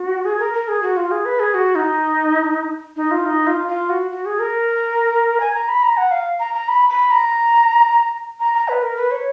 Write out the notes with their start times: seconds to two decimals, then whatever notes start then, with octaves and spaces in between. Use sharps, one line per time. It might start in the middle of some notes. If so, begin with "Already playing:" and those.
Already playing: F#4
0.25 G#4
0.39 A#4
0.54 A#4
0.68 G#4
0.83 F#4
0.97 F4
1.11 G#4
1.25 B4
1.40 G#4
1.54 F#4
1.75 D#4
2.96 D#4
3.11 F4
3.25 D#4
3.47 F4
3.68 F4
3.90 F#4
4.11 F#4
4.26 G#4
4.39 A#4
5.40 G#5
5.54 A#5
5.68 B5
5.83 A#5
5.97 F#5
6.11 F5
6.40 A#5
6.54 A#5
6.68 B5
6.90 B5
7.11 A#5
8.40 A#5
8.54 A#5
8.68 B4
8.83 A#4
8.97 B4
9.11 C#5